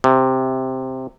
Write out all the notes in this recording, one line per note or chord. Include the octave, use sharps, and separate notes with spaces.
C3